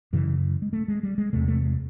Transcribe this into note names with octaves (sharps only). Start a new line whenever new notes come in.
F#2 C#3 E3
G#3
A3
G#3
G3
G#3
E2 C3 A3
A3
G#3